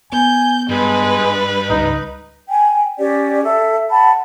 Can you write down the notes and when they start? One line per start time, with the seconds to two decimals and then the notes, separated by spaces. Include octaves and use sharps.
0.12 B3 G#5 G6
0.69 G2 G#3 B4
1.70 D#1 C#2 D#4
2.50 G5 G#5
2.99 C#4 G4 C#5 D5
3.44 A4 E5
3.91 F#5 A5 B5